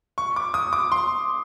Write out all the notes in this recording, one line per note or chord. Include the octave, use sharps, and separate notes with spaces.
C#6
D6
D#6
D6
C6